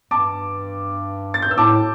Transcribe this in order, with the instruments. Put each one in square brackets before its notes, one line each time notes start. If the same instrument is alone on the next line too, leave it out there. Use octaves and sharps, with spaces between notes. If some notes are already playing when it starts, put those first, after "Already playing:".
[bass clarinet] G2 [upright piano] A5 D6
[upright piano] A6
G6
[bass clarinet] G2 [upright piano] E6
[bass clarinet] A2 [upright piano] A5 D6